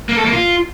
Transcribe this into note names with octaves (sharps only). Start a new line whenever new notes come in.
A#3
A4
A#3
F4